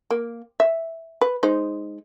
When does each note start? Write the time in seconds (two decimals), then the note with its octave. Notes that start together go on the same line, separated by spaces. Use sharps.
0.11 A#3
0.60 E5
1.21 B4
1.43 G#3 D#4 C5